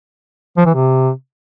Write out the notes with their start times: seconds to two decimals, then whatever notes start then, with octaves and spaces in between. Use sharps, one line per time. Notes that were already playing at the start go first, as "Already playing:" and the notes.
0.57 F3
0.66 E3
0.74 C3